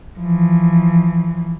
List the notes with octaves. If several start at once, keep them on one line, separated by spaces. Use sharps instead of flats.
E3 F3